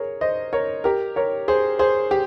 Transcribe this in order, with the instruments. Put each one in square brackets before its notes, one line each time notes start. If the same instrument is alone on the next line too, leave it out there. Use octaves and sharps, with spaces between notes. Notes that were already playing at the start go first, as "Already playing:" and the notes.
Already playing: [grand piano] G#4 A#4 C#5
C5 D#5
A#4 C#5
G4 A#4
A#4 C#5
G#4 C5
G#4 C5
G4